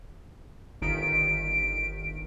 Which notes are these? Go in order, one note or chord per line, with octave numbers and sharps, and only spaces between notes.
G1 D#3 B6 D7